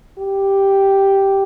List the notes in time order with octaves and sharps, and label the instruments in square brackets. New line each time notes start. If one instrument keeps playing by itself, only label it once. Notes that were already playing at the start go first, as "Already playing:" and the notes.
[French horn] G4